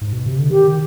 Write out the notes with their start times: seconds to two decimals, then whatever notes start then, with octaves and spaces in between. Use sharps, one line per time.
0.01 G#2
0.13 B2
0.26 C3
0.38 D3
0.50 D#3 G4